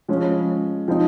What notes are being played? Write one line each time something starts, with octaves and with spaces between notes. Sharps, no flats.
F3 G#3 C#4
F3 C4 D#4